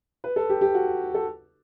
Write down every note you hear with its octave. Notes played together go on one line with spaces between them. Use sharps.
B4
A4
G4
G4
F#4
A4